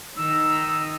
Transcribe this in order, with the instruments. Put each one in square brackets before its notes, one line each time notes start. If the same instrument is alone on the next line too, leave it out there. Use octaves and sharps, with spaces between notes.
[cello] D#3 D#4 [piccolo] E6